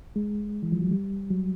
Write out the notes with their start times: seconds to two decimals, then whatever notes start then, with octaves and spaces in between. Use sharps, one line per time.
0.16 G#3
0.63 E3
0.72 F3
0.81 F#3
0.91 G3
1.30 F#3